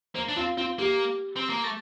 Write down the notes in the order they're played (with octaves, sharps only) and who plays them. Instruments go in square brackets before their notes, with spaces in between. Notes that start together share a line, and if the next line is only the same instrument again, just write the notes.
[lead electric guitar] A#3 [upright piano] C5
[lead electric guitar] D4
[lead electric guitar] C4 [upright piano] F4
[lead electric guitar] C4 [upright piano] F4
[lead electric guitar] A#3 [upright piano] G4
[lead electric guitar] C4
A#3
A3